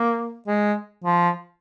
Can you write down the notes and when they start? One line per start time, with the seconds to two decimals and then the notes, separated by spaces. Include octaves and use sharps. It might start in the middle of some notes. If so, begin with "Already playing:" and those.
Already playing: A#3
0.47 G#3
1.04 F3